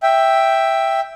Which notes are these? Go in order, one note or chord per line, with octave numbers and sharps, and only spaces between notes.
E5 G5